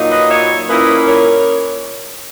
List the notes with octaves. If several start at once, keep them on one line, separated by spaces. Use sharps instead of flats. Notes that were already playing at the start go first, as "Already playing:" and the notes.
Already playing: A#2 F#3 A#3 D#4
B4 D#5
C#5 E5
A#2 A#3 C#4 E4 B4 D#5
A#4 C#5